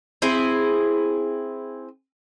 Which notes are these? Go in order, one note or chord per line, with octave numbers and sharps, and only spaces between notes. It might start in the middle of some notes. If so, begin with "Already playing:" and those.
C4 E4 G#4